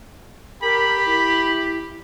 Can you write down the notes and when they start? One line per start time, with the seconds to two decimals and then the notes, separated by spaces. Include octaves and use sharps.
0.62 G4 A#4 B5
1.06 E4